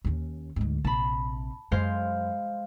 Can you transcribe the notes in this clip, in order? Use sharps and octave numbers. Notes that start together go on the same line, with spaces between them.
D#2 C#4
D2 G#2
A#1 C3 A5 B5
F#2 G#3 C5 F5